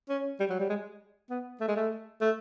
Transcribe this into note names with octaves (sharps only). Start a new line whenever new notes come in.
C#4
G3
F#3
G3
G#3
B3
A3
G#3
A3
A3